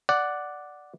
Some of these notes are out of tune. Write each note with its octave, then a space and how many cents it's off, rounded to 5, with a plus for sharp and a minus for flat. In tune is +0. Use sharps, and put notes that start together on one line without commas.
D5 +0 F#5 +0